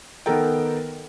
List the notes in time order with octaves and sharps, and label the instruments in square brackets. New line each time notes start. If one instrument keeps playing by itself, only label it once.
[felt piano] D#3 B3 A4 A#4 G5